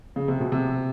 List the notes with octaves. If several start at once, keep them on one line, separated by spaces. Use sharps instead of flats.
C#3
C3
B2
C3